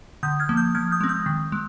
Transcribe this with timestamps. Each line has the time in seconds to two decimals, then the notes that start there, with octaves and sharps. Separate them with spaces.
0.23 D3 D#6 G6
0.40 F6 G#6
0.49 F3 A#3
0.57 D#6 G6
0.75 F3 F6 G#6
0.92 D#6 G6
1.01 G#3 C4
1.09 D#6 G6
1.26 D#3
1.52 G#3